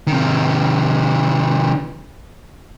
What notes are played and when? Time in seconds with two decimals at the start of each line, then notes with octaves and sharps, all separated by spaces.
0.07 C3 D#3